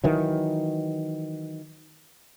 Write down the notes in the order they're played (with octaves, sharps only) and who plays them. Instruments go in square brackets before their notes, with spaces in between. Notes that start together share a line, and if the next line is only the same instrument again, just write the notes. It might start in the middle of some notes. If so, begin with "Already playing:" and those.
[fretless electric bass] D#3 E3 F#3